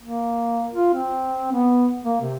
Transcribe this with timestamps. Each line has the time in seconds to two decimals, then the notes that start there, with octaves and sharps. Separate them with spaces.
0.01 A#3
0.73 F4
0.94 C4
1.52 B3
2.04 A#3
2.21 C3